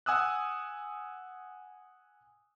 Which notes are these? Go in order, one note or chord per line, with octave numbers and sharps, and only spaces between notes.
F#5 G#5 D#6 E6 F#6